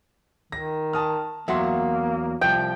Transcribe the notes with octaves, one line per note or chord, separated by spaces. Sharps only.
D#3 A#6
A5 D#6 F6
E2 F#3 A#3 E5 F#5 C6
C2 F3 G5